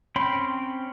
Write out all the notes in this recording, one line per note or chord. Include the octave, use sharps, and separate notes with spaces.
C4 C#4 G5 B5 C6